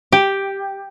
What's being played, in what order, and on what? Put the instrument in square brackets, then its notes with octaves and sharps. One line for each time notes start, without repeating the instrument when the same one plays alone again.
[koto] G4